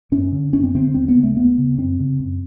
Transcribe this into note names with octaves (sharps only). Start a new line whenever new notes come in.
F#2 C#4
D3
F#2 C#4
C4
D3 C4
D#2 C4
B3
C#3
A3
D#2 B3
C#3
F#2 C4
C#3
F#2